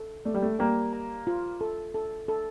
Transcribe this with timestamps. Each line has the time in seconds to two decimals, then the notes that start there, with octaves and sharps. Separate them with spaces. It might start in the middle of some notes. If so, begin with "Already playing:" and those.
Already playing: A4
0.25 A3 D5
0.34 G3
0.42 A3
0.59 G3 A#3 G5
0.93 A#5
1.27 F4
1.61 A4
1.94 A4
2.28 A4